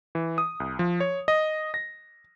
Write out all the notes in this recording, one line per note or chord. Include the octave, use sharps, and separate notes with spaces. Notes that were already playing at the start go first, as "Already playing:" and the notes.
E3
D#6
C2
F3
C#5
D#5
A#6